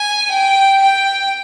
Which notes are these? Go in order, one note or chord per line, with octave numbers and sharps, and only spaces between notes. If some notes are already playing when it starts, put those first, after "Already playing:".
Already playing: G#5
G5
G5